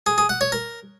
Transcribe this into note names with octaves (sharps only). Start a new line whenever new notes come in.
G#4
G#4
F#5
C#5
A#4